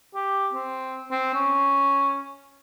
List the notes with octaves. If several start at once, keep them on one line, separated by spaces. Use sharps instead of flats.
G4
C4
C4
C#4